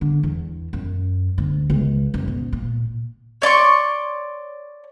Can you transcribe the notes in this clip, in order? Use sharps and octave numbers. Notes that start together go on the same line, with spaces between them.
D3
E2
F#2
D2
C#2
F#1
B2
A#2
C#5 D5 C6 C#6